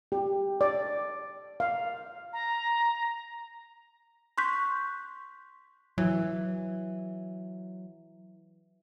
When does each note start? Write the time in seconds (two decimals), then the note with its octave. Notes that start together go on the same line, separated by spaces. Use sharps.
0.12 G4
0.61 D5
1.60 F5
2.33 A#5
4.38 C6 C#6 F#6 G6 B6
5.98 E3 F#3